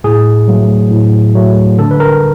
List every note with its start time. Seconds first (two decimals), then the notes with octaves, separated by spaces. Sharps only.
0.04 A2 G#4
0.48 F#3 A3
0.91 A2
1.35 F#3 A3
1.78 D3 A4
1.91 B4
2.00 A#4